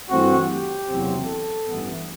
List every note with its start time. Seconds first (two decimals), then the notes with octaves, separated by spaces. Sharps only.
0.09 G2 E3 A3 C4 F#4
0.48 G4
0.88 F#1 E2 C3 F#3 C4
1.25 A4
1.65 A1 G2 E3 B3